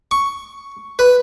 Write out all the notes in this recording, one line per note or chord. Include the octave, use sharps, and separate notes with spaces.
C#6
B4